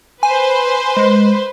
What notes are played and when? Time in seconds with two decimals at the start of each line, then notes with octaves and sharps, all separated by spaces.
0.23 B4 C5 G#5
0.97 G#3